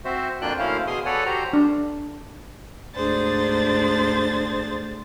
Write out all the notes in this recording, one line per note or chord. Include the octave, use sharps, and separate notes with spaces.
C4 F#4 C5 E5
F2 A#3 D4 F4 G5 F#6
D2 A#3 C#4 E4 C5 F5
B2 G#4 G#5 C6 D#6
A4 B4 C#5 D5 F#5 G#5
F#4 G4 C5 A#5
D4
D2 G#2 D4 G#4 C5 A6